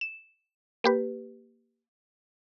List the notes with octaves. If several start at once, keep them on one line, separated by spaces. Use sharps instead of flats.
E7
A#3 G4 B4